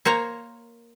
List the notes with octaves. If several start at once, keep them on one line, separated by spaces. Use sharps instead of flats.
A#3 C5 C#5 A#5